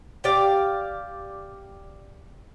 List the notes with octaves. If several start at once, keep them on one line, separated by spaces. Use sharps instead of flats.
G4 D5 F5